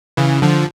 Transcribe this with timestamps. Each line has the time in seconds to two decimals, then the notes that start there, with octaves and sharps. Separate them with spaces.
0.17 C#3 E3
0.42 D3 F3